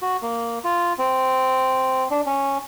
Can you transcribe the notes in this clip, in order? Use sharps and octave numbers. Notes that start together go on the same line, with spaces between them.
F#4
A#3
F4
C4
D4
C#4